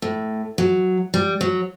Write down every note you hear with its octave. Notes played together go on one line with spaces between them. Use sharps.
A2
F#3
G3
F#3